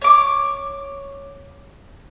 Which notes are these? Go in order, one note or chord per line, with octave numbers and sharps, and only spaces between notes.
C#5 D6